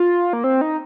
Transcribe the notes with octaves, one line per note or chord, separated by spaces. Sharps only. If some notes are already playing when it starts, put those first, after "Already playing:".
Already playing: F4
A#3
C4
D#4